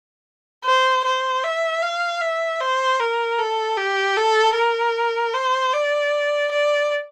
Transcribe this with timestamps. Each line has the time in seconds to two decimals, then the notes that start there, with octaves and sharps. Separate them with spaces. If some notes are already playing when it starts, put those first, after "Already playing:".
0.65 C5
1.05 C5
1.44 E5
1.82 F5
2.21 E5
2.61 C5
3.00 A#4
3.39 A4
3.77 G4
4.17 A4
4.55 A#4
5.34 C5
5.73 D5
6.51 D5